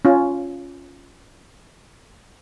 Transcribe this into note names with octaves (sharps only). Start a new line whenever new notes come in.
C#4 F4